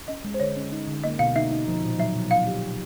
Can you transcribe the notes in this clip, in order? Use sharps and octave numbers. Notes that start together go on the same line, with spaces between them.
C#4 D#5
G#3
C5
D3 C#5
C#4
D#4
D3
A#3 D#5
B2 F5
D#4 E5
D#4
F3
A#2
F#3 E5
B2
D#4 F5
G4
F#3